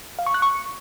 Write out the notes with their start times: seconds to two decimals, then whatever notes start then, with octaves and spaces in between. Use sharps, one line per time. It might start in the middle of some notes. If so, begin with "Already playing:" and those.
0.19 F5
0.26 C#6
0.34 F#6
0.42 C#6